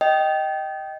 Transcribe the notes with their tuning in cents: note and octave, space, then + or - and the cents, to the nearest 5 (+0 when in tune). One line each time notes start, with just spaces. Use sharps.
D#5 +0 G5 -15